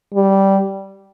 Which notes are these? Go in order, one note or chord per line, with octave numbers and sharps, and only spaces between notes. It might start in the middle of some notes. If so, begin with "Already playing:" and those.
G3